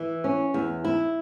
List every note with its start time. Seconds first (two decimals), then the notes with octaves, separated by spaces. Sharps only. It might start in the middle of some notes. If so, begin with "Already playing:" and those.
Already playing: E3
0.24 C#4
0.54 E2
0.84 E4